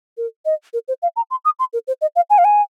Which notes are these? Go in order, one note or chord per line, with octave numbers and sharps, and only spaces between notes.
A#4
D#5
A#4
C5
F5
A#5
C6
D#6
C6
A#4
C5
D#5
F5
G#5
F5
G#5